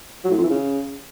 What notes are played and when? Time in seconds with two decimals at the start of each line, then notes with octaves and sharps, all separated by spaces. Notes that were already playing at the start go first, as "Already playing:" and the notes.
0.24 F#3
0.31 A2
0.37 F2
0.43 E3
0.50 C#3